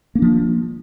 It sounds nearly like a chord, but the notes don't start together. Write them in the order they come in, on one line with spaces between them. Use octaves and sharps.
A#3 D4 F3